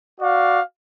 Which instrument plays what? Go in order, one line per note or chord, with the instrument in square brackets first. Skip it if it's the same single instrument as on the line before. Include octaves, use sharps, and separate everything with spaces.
[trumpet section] F#4 D5 F5